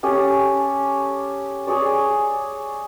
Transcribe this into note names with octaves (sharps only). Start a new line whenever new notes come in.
C#4 G4 A4 D#6
G#4 C#5 D5